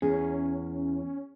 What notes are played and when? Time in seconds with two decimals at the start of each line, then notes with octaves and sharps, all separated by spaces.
0.02 E2 C#4 G#4